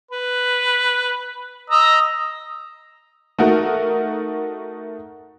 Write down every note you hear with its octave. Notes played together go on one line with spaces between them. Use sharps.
B4
D#5 A#5 E6
A3 D#4 F#4 A#4